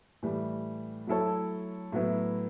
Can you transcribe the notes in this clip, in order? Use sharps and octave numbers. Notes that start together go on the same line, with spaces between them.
A2 E3 G3
F#3 A3 E4 A4 C#5
A2 F#3 B3 E4